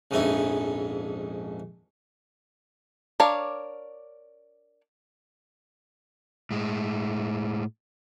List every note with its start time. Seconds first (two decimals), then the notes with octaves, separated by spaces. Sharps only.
0.11 A#1 F2 G#2 C#4 E4
3.20 D4 A#4 C#5 F5
6.51 A2 G#3